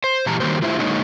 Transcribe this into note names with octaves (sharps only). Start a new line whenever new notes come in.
C5
A#2 E3 G4 A5 A#5
D#3 F#3 G3 A#3 G4 C5
A3 E4 F4 G4 C5 E5
D3 F#3 G#3 A#3 D#4 C#5